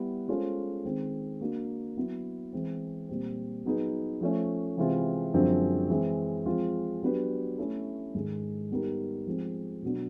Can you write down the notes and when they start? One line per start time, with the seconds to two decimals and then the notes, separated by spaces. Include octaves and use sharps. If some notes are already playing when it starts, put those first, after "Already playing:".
Already playing: G3 B3 E4
0.28 G#3 C#4 F4 A4 C5
0.85 D#3 G#3 C4
1.41 A#3 D4 F#4
1.96 F#3 B3 E4
2.53 E3 G#3 C4
3.09 A#2 G3 C4
3.65 F#3 B3 D#4 G#4 B4
4.21 F3 A3 C#4
4.77 C3 E3 G#3 C4 F4
5.34 F#2 D3 F3 G#3 C4
5.90 E3 G#3 C4
6.46 F3 G#3 C4 F4
7.02 F#3 B3 D4 G4 B4
7.58 A3 C#4 E4 A4
8.14 G#2 D#3 G#3
8.71 G3 B3 D#4 G4 A#4
9.27 F3 G#3 C4
9.82 B2 F#3 B3 D4